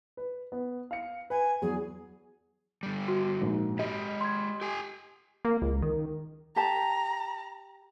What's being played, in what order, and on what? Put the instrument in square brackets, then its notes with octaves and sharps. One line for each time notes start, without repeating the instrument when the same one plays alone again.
[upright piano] B4
B3
F5 C#7
[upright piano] B4 [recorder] G#5
[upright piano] E2 F#3 [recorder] G#4
[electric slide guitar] D3 G3
[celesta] F#4
[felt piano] A#1 G#2
[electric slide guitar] G#3 G4 [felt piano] D#5
[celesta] C6 G#6
[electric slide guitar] G4 G#5
[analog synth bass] A#3
C#2
D#3
[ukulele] G4 A5 [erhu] A#5